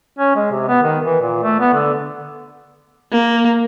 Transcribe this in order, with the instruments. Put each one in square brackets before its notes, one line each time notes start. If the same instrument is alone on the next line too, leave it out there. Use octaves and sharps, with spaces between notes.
[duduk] C#4
G#3
C3
B3
D#3
E3
A#2
A3
B3
D3
[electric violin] A#3